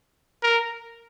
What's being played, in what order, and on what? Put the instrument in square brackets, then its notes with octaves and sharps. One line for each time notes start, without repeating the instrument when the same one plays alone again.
[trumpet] A#4